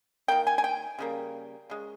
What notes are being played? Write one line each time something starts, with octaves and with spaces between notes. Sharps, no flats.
D#3 A#3 G5
G#5
G#5
G5
C#3 G3 A#3
C#3 G#3